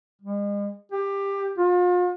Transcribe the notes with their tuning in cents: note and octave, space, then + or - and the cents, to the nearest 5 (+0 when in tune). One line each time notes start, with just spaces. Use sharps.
G#3 -40
G4 +20
F4 +40